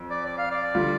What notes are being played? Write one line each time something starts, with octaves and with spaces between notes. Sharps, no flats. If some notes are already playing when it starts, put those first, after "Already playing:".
Already playing: F2
D5
D5
F5
D5
D3 G3 F4